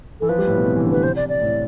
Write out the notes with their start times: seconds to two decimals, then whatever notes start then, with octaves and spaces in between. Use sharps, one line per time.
0.20 E3 A4
0.29 F3 B4
0.39 G3
0.47 A2
0.57 B2
0.66 C3
0.76 E3
0.85 D3
0.91 C3 B4
1.03 C5
1.16 D5
1.29 D5
1.41 A2